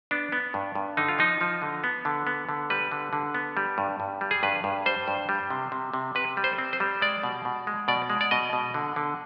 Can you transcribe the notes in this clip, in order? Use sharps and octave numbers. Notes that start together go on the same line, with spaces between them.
B3 D4
B3
G2
G2
D3 D#4
F4
F3 D#4
F3
D3
B3
D3
B3
D3
G3 B4
D3
D3
B3
G3
G2
G2
G3
G#4
G2 B4
G2
G3 C5
G2
G3
C3
C3
C3
C3 B4
G3
C5
C4
C5
G3
G#3 D5
B2
B2
G#3
B2 D5
G#3
D5
B2 D#5
B2
D3
D3